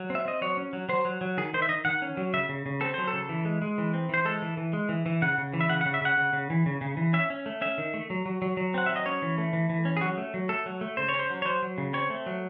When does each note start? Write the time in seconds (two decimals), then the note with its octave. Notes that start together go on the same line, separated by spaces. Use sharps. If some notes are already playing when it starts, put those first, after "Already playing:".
Already playing: F#3
0.10 C4
0.15 E5
0.25 C4 D#5
0.42 F#3 C#5
0.57 C#4
0.73 F#3
0.89 F#3 C5
1.05 F#3
1.21 F#3
1.38 D#3 G#4
1.54 D#3 C5
1.62 E5
1.69 D#3 D#5
1.85 D#3 F#5
2.02 C#4
2.17 F#3
2.34 C#3 E5
2.49 C#3
2.66 C#3
2.81 C4 A4
2.94 F#3 C5
3.08 A4
3.13 C#3
3.29 E3
3.45 G#3
3.62 G#3
3.78 E3
3.94 C4
4.09 E3 C5
4.25 G#3 A4
4.42 E3
4.57 E3
4.73 G#3
4.89 E3
5.06 E3
5.22 C#3 F#5
5.38 C#3
5.53 E3
5.61 E5
5.70 C#3 F#5
5.81 F#5
5.86 C#3
5.94 E5
6.01 C#3 F#5
6.17 C#3
6.33 C#3
6.50 E3
6.66 C#3
6.81 C#3
6.97 E3
7.13 C#4 E5
7.30 C#4
7.46 A3
7.61 C#4 E5
7.78 D#3
7.94 A3
8.10 F#3
8.26 F#3
8.42 F#3
8.57 F#3
8.74 C4 F#5
8.86 F#3 E5
8.96 D#5
9.06 C#4 C#5
9.22 E3
9.38 A3
9.53 E3
9.69 E3
9.85 C#4
9.97 G#4
10.01 F#3 F#4
10.18 A3
10.34 F#3
10.49 A3 A4
10.66 F#3
10.81 A3
10.97 C#3 C5
11.09 C#4 C#5
11.19 C5
11.30 F#3
11.42 C#5
11.45 F#3 C5
11.62 F#3
11.78 C#3
11.93 C4 C#5
12.10 A3
12.26 F#3